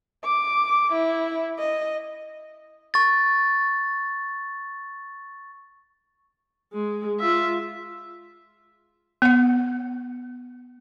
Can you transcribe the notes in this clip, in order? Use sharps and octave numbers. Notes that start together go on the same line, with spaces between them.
D6
E4
D#5
C#6 A6
G#3
F4 E5
B3 F#5